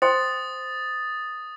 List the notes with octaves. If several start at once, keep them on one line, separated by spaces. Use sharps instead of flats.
C5 G5 C6 D#6 A6